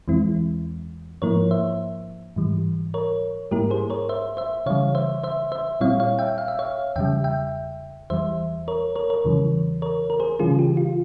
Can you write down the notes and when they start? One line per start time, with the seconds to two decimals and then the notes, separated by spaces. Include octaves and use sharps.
0.08 E2 E3 G#3 C4 E4
1.22 G#2 F3 A#3 E4 A#4 C#5
1.51 C5 E5
2.36 G#2 E3 G3
2.94 A#4 C#5
3.51 G#2 G3 A#3 E4 G4 A#4
3.70 G#4 C5
3.90 A#4 C#5
4.09 C5 E5
4.37 C5 E5
4.66 C#3 E3 G3 C#5 F5
4.95 C5 E5
5.24 C5 E5
5.52 C5 E5
5.81 A#2 G3 C4 E4 C#5 F5
6.00 C#5 F5
6.19 E5 G5
6.38 F5
6.48 E5
6.59 C#5 F5
6.96 E2 C#3 G3 E5 G5
7.24 E5 G5
8.10 E2 E3 G3 C5 E5
8.68 A#4 C#5
8.96 A#4 C#5
9.10 A#4 C#5
9.24 E2 C#3 E3 G3
9.82 A#4 C#5
10.10 A#4
10.20 G#4 C5
10.39 C#3 E3 G3 C#4 F4 G#4
10.59 G4
10.77 F4